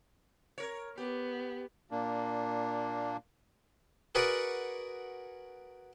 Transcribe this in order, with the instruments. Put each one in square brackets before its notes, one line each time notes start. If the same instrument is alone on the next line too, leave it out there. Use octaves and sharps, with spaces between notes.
[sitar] A#4 C#5
[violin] B3 [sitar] G4
[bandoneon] A#2 A#3 D4
[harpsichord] F#4 G#4 A#4 B4 D5 F#5